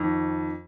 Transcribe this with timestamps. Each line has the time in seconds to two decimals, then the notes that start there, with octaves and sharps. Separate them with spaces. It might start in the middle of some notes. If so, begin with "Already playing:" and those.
Already playing: F2 D#3